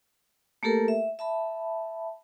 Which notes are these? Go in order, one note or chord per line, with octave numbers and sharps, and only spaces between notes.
A3 A#3 G4 A4 A#4
E5
E5 A5 B5